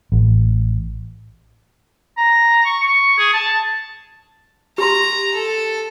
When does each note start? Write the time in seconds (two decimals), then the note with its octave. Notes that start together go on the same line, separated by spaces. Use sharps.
0.12 A1
2.17 A#5
2.65 C#6
2.83 C#6
3.18 G#4
3.33 A5
4.78 G4 A#5 C6
5.34 A4